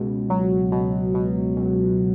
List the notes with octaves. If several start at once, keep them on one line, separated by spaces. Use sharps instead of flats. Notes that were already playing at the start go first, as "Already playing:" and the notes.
Already playing: C#2 B2
F#3
B2
B2
C#2